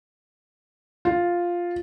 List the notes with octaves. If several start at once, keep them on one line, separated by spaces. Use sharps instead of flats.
F4